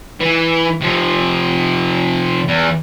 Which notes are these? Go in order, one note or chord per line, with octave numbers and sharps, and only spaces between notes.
E3
C3 F3
E2